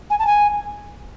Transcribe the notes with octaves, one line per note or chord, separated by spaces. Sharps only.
G#5
A5
G#5